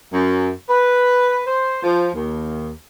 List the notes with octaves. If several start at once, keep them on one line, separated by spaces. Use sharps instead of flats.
F#2
B4
C5
F3
D#2